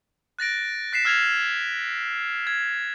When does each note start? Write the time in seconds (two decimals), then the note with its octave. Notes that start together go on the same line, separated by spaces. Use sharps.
0.39 F#6 A6 A#6 D7
0.93 F#6 B6 C7 E7
1.05 E6 F6 G#6 A#6 F7
2.47 G#6